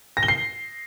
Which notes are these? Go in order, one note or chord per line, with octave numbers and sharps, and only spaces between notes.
A#6
G7
C7